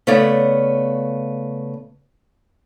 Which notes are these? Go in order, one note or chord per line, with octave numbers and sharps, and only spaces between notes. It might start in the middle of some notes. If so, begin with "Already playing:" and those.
C#3 A3 B3 C#5 D5